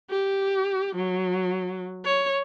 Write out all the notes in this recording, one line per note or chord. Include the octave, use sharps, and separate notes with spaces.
G4
F#3
C#5